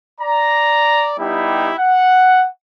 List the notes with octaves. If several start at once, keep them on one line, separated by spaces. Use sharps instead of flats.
D5 A#5
G3 B3 D#4 E4 G4
F#5